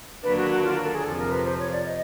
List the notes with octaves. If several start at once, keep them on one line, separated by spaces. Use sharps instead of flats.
D#2 D3 F#3 A#3 D4 B4
F#4
F#4
F4
A#4
A4
G#4
F2 C3 F3 A4
A#4
B4
C5
C#5
D5
D#5